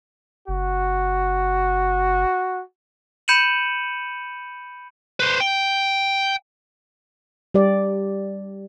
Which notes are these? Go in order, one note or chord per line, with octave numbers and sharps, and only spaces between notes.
F#1 F#4
B5 G6 C#7 D#7 E7 F#7
B4 C5
G5
G3 G4 D5